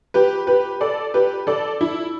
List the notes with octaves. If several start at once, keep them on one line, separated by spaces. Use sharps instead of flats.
G4 B4
G4 B4
A4 D5
G4 B4
A4 D5
E4